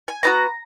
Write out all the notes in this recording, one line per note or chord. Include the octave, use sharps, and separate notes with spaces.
G#5
B3 D#4 F#4 A#5